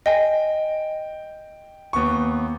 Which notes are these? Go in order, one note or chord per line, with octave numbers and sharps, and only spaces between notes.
D#5 G5 G#5
D#2 B3 C#6